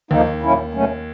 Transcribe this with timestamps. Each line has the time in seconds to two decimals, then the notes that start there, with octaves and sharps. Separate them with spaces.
0.11 D#2 D3 D#3 F3 A#3 D#4
0.42 A#2 F#3 A#3 C#4 E4
0.73 B2 F#3 A3 C#4